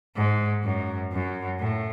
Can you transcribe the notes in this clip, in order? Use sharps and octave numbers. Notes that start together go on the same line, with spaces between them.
G#2
F#2
F#2
A2